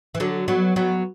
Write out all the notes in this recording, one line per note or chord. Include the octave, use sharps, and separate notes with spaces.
E3
D3 F#3
F#3 B3
F#3 B3